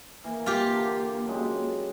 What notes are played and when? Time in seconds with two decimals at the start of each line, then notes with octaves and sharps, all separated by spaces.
0.24 E3 A#3
0.46 F4 G4
0.75 D3
1.26 F#2 G3 G#3